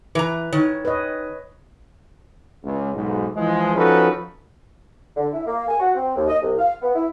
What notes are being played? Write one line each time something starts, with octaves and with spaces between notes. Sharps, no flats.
E3 B4 A#5
D#3 C#5
B4 C#5 D#5
C#2
B1 G#2
E3 F3 G#3
F3 C#4 D#4 F#4 A4 B4
D3
E4
A#3
G#5
F#4
C4
D#2
D#5
C2
F5
B3
E4